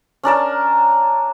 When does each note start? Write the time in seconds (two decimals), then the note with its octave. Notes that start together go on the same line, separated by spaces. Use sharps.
0.23 C#4 D4 A#4 A5